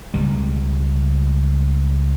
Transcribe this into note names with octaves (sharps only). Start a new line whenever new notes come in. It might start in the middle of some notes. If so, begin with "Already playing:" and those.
C#2 G3